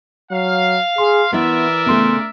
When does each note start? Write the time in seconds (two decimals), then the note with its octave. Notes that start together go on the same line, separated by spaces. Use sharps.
0.31 F#3 F5
0.98 G#4 C6
1.33 E3 B3 E4 A#4 D5 E5
1.87 C#3 A3 B3 C6